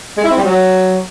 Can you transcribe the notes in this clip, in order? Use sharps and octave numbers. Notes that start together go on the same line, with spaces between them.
G#3
E4
C4
G3
F#3